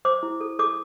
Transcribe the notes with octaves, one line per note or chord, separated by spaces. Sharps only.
C5 D6
E4
A4
A4 D6